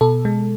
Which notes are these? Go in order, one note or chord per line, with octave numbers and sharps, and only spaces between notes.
B2 A4
G#3